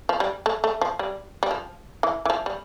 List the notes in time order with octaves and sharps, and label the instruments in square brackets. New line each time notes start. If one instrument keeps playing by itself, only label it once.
[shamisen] F3
G3
A3
A3
F3
G3
G3
F3
E3
E3
F3
G3